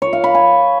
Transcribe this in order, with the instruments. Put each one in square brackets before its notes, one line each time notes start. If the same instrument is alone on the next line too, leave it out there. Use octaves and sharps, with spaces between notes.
[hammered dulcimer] C#5
F5
B5
G#5